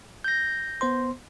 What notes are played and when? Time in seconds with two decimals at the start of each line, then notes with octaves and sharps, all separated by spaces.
0.24 G6 A#6
0.81 B3 C5 C6